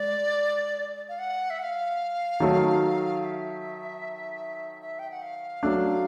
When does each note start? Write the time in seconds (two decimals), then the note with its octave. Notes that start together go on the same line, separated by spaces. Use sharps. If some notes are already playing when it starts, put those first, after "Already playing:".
Already playing: G#3 D5
1.09 F5
1.19 F#5
1.50 E5
1.59 F#5
1.63 F5
2.40 D#3 F#3 A3
3.21 F5
3.24 E5
4.82 E5
4.99 G5
5.11 F#5
5.22 F5
5.63 F#3 A3 D4